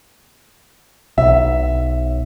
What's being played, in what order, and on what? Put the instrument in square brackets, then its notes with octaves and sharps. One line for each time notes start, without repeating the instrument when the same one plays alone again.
[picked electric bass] B1 [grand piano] E5